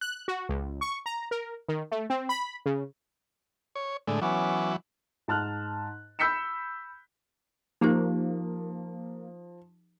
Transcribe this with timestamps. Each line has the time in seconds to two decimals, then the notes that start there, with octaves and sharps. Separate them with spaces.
0.01 F#6
0.28 F#4
0.49 C#2
0.81 C#6
1.06 A#5
1.31 A#4
1.69 D#3
1.92 A3
2.10 C4
2.29 B5
2.66 C#3
3.76 C#5
4.07 A2 D3 G#3
4.22 E3 F#3 B3 C#4 D6
5.28 G#2 A5 F6 F#6
6.19 B5 E6 G6 B6 C#7 E7
7.81 F3 A#3 D#4 G4 C5